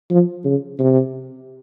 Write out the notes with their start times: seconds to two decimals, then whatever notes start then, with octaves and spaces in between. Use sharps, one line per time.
0.11 F3
0.45 C#3
0.79 C3